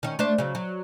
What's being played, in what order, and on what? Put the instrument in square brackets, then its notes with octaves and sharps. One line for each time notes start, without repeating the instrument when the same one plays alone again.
[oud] D#3 C#4
A3 D4 C5
C#3 F#3
F#3